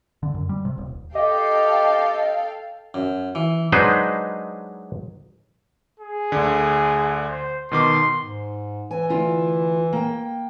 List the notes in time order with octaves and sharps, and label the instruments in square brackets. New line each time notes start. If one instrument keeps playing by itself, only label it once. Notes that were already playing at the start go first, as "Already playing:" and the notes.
[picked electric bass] D3
F#2
G3
C3
D#1
[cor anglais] G4 [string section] A4 F5 G5 [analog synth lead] D#5
[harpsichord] F#2
E3
[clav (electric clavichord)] F#3 G#3 D4 D#4 B4 C5
[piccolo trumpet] G#4
[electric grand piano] D2 D3
[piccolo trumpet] C5
[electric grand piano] B2 D#3 D6 [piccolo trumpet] C6
[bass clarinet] G#2
[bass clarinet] E3 [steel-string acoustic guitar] G#5
[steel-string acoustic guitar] D2 E4 F4
A#3 G5